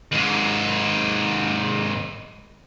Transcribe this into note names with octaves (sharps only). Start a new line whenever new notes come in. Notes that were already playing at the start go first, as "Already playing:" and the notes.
D#2 G#2